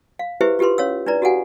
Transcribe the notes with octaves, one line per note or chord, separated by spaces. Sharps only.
F5
E4 G4 G#4 B4 C5 E5
F4 G4 A4 B4 C6
C#4 C#5 F5 E6
D4 E4 B4 D5 A#5
F#4 G4 A4 F5 F#5 G#5